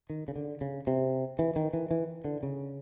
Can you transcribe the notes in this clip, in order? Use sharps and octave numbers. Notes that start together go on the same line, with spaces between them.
D#3
C#3
D3
C#3
C3
E3
D#3
E3
E3
D3
C#3